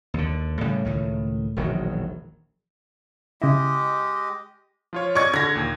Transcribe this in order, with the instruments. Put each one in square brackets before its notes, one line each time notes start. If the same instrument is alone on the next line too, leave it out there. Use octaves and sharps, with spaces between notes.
[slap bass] D#2 D3
A2 C#3 G3
C#2 A2 D#3
E1 A#1 D#3 F#3
[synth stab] C#3 E4 [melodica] G#3 G4 D#5
[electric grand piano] F3 F4 C#5
[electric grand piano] D5 D#5 C#7 [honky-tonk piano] C#6 G#6
[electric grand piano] D3 [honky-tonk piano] G#6 A#6
[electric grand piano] D#2 A#2